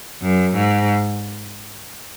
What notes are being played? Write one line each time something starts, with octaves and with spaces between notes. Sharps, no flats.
F#2
G#2